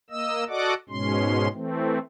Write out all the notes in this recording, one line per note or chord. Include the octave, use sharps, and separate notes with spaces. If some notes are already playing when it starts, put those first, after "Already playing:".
A#3 D#5 E6
F#4 A4 D5 D#5 F#5 D6
G#2 B2 G#3 C#4 C6
E3 A3 C4